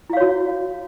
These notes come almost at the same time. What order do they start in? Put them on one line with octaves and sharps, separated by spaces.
E4 F5 C#5 F#4